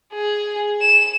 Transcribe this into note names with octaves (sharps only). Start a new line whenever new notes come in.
G#4
E7